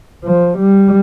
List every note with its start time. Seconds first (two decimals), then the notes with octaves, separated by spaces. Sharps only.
0.24 F3
0.58 G3